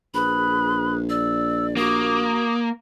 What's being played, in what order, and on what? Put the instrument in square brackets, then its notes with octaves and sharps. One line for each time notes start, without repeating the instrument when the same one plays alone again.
[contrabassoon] A#1 [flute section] G#4 B4 F#6 [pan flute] B5
[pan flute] D5 [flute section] E6
[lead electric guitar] A#3 [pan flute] F#4 [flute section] D#6